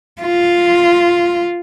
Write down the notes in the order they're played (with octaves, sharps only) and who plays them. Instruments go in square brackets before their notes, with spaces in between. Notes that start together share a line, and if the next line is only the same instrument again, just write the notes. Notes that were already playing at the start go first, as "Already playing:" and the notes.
[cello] F4